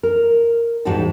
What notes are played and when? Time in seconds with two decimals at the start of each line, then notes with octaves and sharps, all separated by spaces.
0.03 A#4
0.85 E2 G#2 G3 G#3 F#4 A5